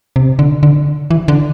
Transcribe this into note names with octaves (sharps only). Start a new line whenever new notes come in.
C3
D3
D3
E3
D3